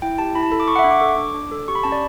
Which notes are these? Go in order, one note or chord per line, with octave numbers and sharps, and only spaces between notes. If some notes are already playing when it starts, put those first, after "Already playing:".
E4 G5
G4 A5
E4 B5
A5
A4 B5
D6
A4 C#6
F#5
E5
D4
D6
A4 C#6
D6
D4
D4
A4
G4 C#6
B5
C#4 A5
D5